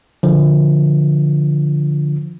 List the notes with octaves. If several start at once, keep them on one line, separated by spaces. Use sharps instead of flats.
D3 F3